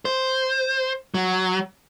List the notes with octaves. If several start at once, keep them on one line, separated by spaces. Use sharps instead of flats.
C5
F#3